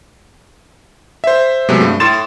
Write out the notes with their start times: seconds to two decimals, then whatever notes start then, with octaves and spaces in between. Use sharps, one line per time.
1.24 C5 E5
1.69 C3 F#3 G#3 A3 B3
1.81 G2 A3
2.00 A2 C6 A6 E7